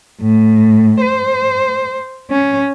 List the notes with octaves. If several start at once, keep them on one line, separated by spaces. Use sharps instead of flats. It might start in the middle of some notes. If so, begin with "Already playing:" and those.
A2
C5
C#4